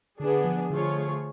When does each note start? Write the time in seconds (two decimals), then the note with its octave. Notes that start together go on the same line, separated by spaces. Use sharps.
0.20 D3 B3 D4 G#4
0.44 F3
0.70 D3 F3 A3 F4 G#4 C#5